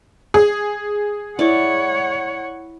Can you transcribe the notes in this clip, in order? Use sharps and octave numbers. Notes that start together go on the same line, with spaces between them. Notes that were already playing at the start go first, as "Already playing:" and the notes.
G#4
E4 C#5 D5 F#5